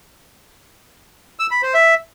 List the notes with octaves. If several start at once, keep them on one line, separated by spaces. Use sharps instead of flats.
E6
B5
C5
E5